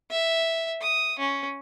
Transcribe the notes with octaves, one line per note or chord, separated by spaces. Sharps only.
E5
D#6
C#4